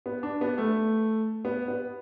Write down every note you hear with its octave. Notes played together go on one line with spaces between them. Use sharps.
B3
D4
B3
A3
B3
B3